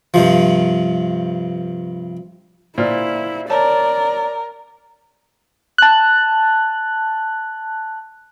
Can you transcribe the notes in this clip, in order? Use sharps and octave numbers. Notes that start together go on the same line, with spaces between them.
G2 C3 F3
A#2 E4 C5 D5 F6
A#4 C#5 D5 A5
A5 F#6